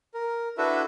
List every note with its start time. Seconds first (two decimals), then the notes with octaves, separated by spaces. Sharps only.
0.14 A#4
0.58 D4 E4 F#4 A4 B4 E5